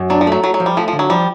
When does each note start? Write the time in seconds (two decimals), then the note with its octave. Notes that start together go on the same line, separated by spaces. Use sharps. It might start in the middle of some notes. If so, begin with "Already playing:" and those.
Already playing: F#2
0.10 F#3 D4
0.21 F3
0.27 F#3 A3
0.43 F#3 A3
0.54 F#3
0.60 F3
0.66 G3
0.77 F3 A3
0.88 D3 F3
0.99 F#3
1.10 F3 G3